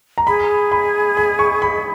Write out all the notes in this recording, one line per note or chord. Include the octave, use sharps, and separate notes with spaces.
A#5
G#4 B5
B5
B5
C#6
B5